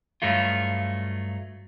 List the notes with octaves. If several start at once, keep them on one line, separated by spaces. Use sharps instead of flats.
G2 F#3 A3 F4